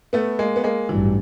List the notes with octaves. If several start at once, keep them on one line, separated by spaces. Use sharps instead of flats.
A3 B3
G#3 A#3
B3
G#3 A#3
A1 G2 E3 F#3